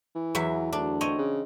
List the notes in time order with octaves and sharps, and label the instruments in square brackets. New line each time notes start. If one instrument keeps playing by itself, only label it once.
[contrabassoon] E3
[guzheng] E2 F#3 E5
[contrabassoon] D2 [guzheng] D4
[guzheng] C4 C#5 D#5
[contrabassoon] C#3